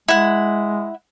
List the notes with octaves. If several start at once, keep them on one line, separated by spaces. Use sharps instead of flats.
G#3 E4 F#5